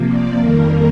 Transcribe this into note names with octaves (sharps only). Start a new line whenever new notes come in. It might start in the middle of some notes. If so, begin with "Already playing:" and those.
Already playing: C3 F3 A#3
D5
F2 D#3 G3 A#3 A#4